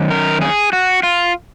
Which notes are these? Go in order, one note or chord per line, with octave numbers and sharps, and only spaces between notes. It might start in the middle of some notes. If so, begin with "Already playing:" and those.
Already playing: F#2 D#3
A#4
G#4
F#4
F4